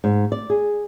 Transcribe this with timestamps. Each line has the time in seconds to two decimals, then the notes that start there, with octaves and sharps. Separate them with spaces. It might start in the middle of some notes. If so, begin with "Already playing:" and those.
0.04 G#2
0.32 D5
0.50 G#4